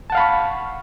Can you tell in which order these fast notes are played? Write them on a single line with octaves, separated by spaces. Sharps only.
A5 F#5 F5 B5 C#6